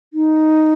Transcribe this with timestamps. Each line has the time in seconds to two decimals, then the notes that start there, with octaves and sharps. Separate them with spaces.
0.13 D#4